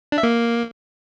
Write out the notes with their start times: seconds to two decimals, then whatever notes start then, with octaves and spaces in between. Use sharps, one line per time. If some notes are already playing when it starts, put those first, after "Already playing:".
0.12 D4
0.18 E5
0.23 A#3